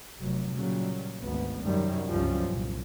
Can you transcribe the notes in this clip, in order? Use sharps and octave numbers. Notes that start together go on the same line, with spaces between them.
F1 F#3
A#2 C#3 F#3 G3
G#1 D2 B3
F#2 C3 D#3 G3
G1 C#2 F#2 F3 G3 C#4
C2 A#2